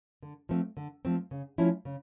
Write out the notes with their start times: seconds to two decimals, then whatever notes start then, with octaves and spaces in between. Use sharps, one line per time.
0.23 D3
0.49 F3 A3 C4
0.77 D3
1.05 F3 A3 C4
1.31 C#3
1.58 F3 A3 C#4 E4
1.85 C#3